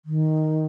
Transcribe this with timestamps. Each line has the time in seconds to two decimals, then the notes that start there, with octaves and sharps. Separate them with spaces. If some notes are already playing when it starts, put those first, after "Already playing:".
0.05 D#3